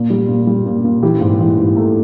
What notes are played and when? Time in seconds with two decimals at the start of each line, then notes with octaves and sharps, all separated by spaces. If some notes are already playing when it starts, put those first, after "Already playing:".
Already playing: A#2
0.10 G3
0.29 A#2
0.47 G3
0.66 A#2
0.84 A#2
1.03 E3 G4
1.21 G#2
1.40 E3
1.57 G#2
1.77 A3